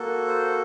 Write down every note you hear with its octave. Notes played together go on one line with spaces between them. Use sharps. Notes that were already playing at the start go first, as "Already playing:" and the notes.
Already playing: A#3 F#4 A4
C5